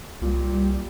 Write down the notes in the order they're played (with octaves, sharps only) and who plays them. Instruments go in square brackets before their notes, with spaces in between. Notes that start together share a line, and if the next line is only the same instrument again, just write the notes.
[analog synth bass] C2 [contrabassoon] A#2 [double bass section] G3